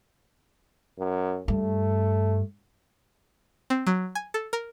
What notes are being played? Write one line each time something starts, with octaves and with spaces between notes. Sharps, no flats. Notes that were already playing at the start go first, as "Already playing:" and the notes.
F#2
G2 A3
C4
F#3
G#5
A4
A#4